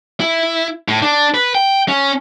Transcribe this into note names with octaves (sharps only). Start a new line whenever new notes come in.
E4
A2
D4
B4
G5
C#4